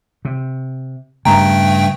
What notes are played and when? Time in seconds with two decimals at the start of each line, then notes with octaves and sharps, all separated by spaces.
0.25 C3
1.25 G2 C#3 G3 A3 G5 A#5